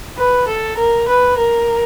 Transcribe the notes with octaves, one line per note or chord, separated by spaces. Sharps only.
B4
A4
A#4
B4
A#4